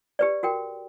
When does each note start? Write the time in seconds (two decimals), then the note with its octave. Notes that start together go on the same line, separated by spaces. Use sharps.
0.19 G4 B4 D5
0.43 F#4 A#4 G5